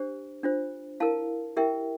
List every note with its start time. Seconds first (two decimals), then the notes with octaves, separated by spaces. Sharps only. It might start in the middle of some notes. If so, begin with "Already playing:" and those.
Already playing: D4 G4 C5
0.43 D4 F4 C5
1.00 E4 A#4 F5 A5
1.57 E4 G4 A#4 E5 G5